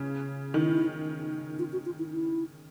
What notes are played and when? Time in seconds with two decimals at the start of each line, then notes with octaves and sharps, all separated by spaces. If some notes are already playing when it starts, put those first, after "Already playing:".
Already playing: C#3
0.54 D#3 E4
1.59 F4
1.72 F#4
1.85 F4
1.98 E4
2.12 E4